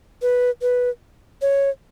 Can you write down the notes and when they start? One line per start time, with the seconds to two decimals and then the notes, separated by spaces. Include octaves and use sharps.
0.22 B4
0.62 B4
1.42 C#5